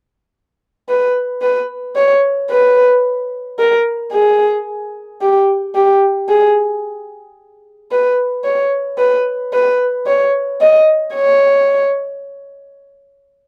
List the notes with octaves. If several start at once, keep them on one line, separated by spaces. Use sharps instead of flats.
B4
B4
C#5
B4
A#4
G#4
G4
G4
G#4
B4
C#5
B4
B4
C#5
D#5
C#5